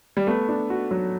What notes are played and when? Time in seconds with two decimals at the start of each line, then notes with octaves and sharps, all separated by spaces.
0.17 G3
0.27 A3 B3
0.49 D4
0.70 F#4
0.91 F#3